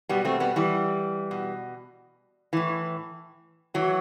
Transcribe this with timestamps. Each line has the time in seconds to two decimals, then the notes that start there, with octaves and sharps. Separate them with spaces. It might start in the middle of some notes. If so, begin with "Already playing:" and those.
0.09 B2 G3 B3
0.25 A3 C4
0.40 G3 B3
0.56 E3 G3
1.31 B2
2.53 A2 E3
3.74 A2 E3 F#3